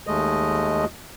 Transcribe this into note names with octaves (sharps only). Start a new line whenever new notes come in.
D#2 G#3 A3 D#5